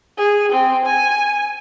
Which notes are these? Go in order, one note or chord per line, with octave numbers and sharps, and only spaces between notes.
G#4
C4
G#5